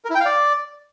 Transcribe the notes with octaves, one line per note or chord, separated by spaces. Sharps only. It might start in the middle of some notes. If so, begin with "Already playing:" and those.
A#4
E4
G5
F5
D5